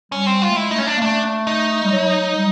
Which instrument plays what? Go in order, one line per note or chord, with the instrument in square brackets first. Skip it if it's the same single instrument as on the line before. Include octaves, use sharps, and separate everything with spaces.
[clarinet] G3 [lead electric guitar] C#4
[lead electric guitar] C4
F4
[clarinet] A3
[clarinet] G#3 [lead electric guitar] E4
[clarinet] A3 [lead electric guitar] D#4
[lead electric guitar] C#4
D4
[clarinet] A#3
[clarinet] A3 [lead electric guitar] D4
[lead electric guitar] D#4
[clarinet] G3
F#3
G3